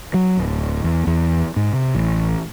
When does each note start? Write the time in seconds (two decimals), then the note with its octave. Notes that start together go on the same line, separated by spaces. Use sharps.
0.14 F#3
0.37 D1
0.84 E2
1.07 E2
1.56 G#2
1.73 C3
1.95 A1